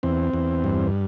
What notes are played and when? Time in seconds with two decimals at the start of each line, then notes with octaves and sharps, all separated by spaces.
0.03 E2 C4
0.33 E2
0.64 G2